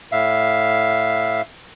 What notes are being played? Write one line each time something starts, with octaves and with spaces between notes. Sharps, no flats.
A2 E5 F5